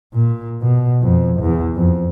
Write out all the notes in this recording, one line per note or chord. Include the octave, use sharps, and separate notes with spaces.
A#2
B2
F2
E2
F2